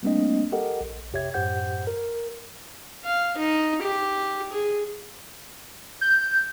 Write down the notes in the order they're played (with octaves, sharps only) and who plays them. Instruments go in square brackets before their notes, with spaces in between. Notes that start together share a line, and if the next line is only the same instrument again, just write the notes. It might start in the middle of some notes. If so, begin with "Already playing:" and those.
[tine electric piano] G3 A3 A#3 C4 D4 D#5
G4 A4 A#4 D#5 F#5
A#1
F2 C3 G4 C#5 E5 G#6
F#2 A2 G4 C5 F#5 G6
A#4
[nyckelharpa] F5
D#4
G4
G#4
[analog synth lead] G6